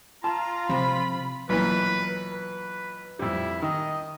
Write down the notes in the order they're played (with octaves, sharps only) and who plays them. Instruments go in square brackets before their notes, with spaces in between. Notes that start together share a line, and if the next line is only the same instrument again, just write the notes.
[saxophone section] F4 [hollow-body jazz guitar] A5 [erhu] A#5
[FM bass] C3 [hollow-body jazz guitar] F3 [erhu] B5
[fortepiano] B1 A#2 E3 [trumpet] B4
[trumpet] B4
[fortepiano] F2 G3 [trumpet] E4
[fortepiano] D#3 [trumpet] D#5